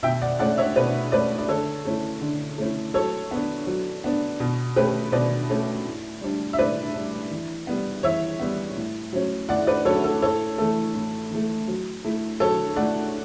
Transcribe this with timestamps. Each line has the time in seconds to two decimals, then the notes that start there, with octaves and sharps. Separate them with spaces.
0.03 B2 E5 G5
0.22 D5 F#5
0.39 A3 C#4 D5 F#5
0.58 C#5 E5
0.76 B2 B4 D5
1.12 A3 C#4 B4 D5
1.39 D5
1.49 D3 A4 C#5
1.85 A3 C#4 E4
2.21 D3
2.58 A3 C#4 E4
2.94 F#3 A4 C#5
3.31 B3 D4
3.67 F#3
4.04 B3 D4
4.40 B2
4.76 A3 C#4 G4 B4
5.12 B2 B4 D5
5.50 A3 C#4
5.85 A2
6.21 G3 D4
6.53 E5
6.59 A2 B4 D5
6.94 G3 D4
7.31 E3
7.67 G3 B3
8.03 E3 C#5 E5
8.40 G3 B3
8.76 A2
9.13 F#3 C#4
9.49 A2 D5 F#5
9.67 B4 D5
9.85 F#3 C#4 A4 C#5
10.04 A4
10.22 A2 A4 C#5
10.58 E3 A3 A4
10.95 A2
11.31 E3 A3
11.68 F#3
12.04 A3 E4
12.40 F#3 A4 C#5
12.76 A3 E4 D5 F#5